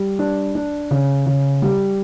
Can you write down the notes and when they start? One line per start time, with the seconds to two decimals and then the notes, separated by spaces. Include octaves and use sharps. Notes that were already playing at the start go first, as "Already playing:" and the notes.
Already playing: G3
0.19 D4
0.55 D4
0.91 C#3
1.26 C#3
1.62 G3